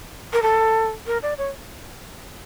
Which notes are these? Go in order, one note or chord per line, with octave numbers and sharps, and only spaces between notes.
A#4
A4
A#4
D5
C#5